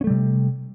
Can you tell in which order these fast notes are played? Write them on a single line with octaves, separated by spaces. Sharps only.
C#4 A3 G3 C3